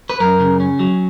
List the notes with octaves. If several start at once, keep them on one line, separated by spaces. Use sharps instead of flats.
B4
F#2 A#4
C#3
C#4
F#3